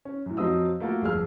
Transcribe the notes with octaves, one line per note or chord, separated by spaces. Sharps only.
C#4
F#2 A2
F2 F#3 C4 D#5 D#6 E6
A3 A#3 F4 F#4 A4 A#4
G1 F2 G#4 E6 F6